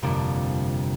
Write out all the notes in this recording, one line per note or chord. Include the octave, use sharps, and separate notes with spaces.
G1 F2 C3 A#3 D4